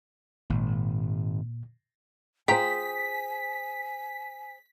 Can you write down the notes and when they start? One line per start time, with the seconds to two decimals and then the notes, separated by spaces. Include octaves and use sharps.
0.50 G#1 A#2
2.48 F4 G#4 C5 G5 G#5 A#5 B6